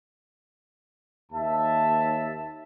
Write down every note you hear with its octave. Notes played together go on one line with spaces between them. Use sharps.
D#2 E5 A5